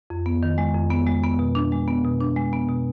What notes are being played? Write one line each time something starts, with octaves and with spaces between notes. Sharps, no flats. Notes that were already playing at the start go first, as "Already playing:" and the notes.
F2
B3
D#3
G#3
F2
B3
G#3
B3
B2
D4
G#3
B3
B2
D4
G#3
B3
B2